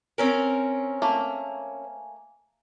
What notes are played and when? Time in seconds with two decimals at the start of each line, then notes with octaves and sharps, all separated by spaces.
0.18 C4 C#4 A#4 G#5
1.02 A3 A#3